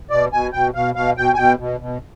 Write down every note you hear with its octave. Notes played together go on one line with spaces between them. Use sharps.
B2 D5
B2 G#5
B2 G5
B2 F5
B2 F5
B2 G5
G#5
B2 G5
B2
B2